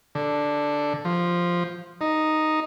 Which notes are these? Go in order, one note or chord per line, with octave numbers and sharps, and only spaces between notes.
D3
F3
D#4